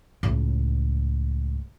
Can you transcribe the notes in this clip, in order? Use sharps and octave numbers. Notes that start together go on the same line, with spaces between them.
C#2 A2